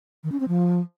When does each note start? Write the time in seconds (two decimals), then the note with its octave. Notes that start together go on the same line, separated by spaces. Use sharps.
0.24 D#3
0.32 C#4
0.40 C4
0.48 F3